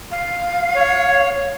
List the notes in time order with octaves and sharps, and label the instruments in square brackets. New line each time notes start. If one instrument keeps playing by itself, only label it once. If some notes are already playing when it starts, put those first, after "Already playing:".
[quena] F5
[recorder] C#5